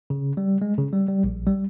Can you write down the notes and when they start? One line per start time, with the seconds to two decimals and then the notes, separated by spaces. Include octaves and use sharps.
0.10 C#3
0.37 G3
0.62 G#3
0.78 C#3
0.93 G3
1.08 G3
1.24 A#1
1.47 G3